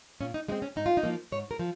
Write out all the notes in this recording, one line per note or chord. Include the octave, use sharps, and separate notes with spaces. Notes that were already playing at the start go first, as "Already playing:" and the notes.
A#2 C#4
D#4
G#3 C4 D#4
C#4
G#2 D#4
F4
D#4
F3 A#3
G#2 C#5
A#4
F3